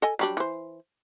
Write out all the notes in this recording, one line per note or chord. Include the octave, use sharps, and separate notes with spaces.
A4 D#5 G#5
F#3 G3 D4
E3 C5